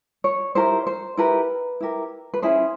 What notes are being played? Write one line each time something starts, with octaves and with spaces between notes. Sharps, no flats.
C#5
E4 G4 A#4 C5
C5
E4 G4 A#4 B4
E4 G4 A#4
B4
C#4 E4 G#4 C5